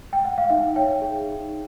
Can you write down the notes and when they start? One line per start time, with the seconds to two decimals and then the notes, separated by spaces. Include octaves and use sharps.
0.13 G5
0.25 F#5
0.38 F5
0.50 D#4 E5
0.76 C#5 G5
1.02 G#4
1.28 D#4